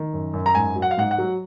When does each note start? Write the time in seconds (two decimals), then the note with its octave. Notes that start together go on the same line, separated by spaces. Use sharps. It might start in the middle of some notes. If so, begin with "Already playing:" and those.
Already playing: D#3
0.13 F#2
0.34 F#2
0.46 A#5
0.55 G#2 G#5
0.76 F#3
0.82 F#5
0.91 F5
0.97 G#2 F#5
1.11 F#5
1.18 F#3